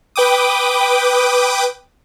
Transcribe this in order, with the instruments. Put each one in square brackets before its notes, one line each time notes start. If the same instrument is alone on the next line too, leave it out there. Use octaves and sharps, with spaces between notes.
[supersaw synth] B4 G5 D6 D#6